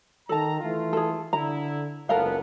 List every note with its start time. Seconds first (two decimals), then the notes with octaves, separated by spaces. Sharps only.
0.29 D#3 A4 A5 A#5
0.60 E3 A3 F4
0.93 G#4 A4
1.33 D3 E4 A#5
2.09 F#1 C#2 B3 A4 A#4 F5